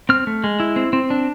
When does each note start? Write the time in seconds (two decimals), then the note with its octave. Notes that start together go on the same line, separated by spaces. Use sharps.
0.09 C4 F6
0.27 A3
0.44 G#3
0.60 E4
0.76 C4
0.93 C4
1.10 D4